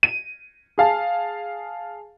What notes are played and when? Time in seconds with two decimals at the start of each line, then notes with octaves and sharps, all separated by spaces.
0.03 D#7
0.78 G#4 F5 A5